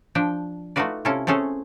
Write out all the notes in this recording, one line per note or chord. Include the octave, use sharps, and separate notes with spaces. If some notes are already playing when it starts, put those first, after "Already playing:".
F3 D4 G5
A3 D#4 F4 F#4 B4 D5
C3 C#4 E4 F4 A4
A3 C4 C#4 G#4 A4